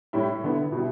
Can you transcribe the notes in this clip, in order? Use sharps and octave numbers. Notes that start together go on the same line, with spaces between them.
A2 G3 E4
D3 B3 E4
B2 G3 E4